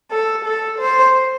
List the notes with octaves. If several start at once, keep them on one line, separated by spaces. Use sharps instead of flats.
A4
A4
C5